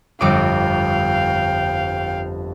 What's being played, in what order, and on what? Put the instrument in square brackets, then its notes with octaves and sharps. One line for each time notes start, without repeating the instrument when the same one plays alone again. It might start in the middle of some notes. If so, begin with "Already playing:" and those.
[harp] G1 F2 D6 [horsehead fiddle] F5 G5